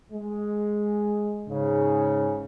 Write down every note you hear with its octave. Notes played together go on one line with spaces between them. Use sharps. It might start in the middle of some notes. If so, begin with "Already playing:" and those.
G#3
G#2 C#3